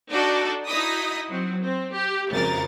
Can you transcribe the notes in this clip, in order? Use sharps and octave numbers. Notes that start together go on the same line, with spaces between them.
D4 D#4 F#4 A4 D5
D#4 E4 F#4 D#5 D#6 B6
F#3 C4
C4
G4
G#1 F2 C#3 A#4 A6